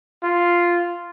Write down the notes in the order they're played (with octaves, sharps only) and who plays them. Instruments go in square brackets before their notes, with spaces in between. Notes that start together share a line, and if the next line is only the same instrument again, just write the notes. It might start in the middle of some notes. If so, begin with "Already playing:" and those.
[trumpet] F4